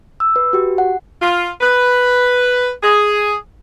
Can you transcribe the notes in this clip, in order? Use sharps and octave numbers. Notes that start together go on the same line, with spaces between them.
E6
B4
F#4 G4
F#5
F4
B4
G#4